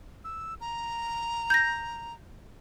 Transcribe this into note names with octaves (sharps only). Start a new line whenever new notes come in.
E6
A#5
G6 A#6